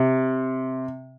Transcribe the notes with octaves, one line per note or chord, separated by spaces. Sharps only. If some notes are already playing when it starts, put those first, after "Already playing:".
Already playing: C3